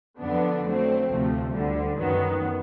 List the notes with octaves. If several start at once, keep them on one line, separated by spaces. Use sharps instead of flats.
F2 D3 F#3 B3 D4
F#3 A3 C4
D2 C3 F3 A3
D2 D3 G3
F#2 D#3 F#3 B3